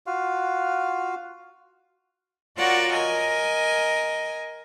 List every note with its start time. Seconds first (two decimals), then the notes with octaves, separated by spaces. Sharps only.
0.06 F4 F#4 F5
2.58 F4 F#4 A#4 C#5 D5 F#5
2.92 A#4 D#5 G#5